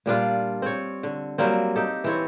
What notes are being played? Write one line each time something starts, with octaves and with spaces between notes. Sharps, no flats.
A#2 G3 D4 F4
C4 C#5
D3
F#3 G3 A#3 C4
D#4 G4 A4
E3 C4 C#5